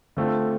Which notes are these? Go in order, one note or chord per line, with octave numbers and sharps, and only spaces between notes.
D3 A3 C4 F4